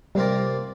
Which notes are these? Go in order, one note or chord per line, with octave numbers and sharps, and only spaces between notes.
C3 G3 A#3 F4 A#4 D5